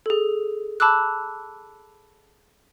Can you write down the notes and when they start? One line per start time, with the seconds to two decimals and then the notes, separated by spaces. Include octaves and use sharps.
0.06 G#4 A4
0.80 A5 B5 D6 E6 F#6